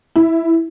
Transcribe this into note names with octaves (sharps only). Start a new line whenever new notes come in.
E4